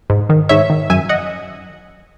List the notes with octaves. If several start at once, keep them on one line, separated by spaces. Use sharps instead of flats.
G#2
D#3
G#2 C#5 E5
D#3
F#2 E5 G#5
D#5 F#5